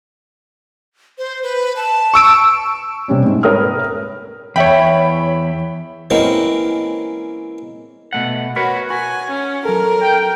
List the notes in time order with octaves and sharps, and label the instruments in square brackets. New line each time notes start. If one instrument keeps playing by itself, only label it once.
[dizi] C5
B4
A5
[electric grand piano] C#6 E6 D7
[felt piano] C3 G3 C#4
G#2
A#4 B4 C#5 D#6 F6
[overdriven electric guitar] E2 [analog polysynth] C#5 B5 [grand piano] E5 G5
[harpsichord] E3 G#3 A#3 C4 C#4 F#4
[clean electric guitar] B2 A3 F#5
[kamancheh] F#4 [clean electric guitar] A#4 B4 C#5
[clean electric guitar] F#4 [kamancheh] G#5
[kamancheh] C#4
[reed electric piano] F#3 A4 [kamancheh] A#4
[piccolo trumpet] G5